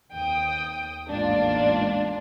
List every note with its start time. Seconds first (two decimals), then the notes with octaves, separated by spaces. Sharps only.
0.12 D#2 G5 D#6
1.09 A1 E2 G#2 A#3 D4 F4